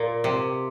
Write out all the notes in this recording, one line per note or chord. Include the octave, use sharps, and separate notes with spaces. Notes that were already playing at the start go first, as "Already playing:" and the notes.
Already playing: A#2
C3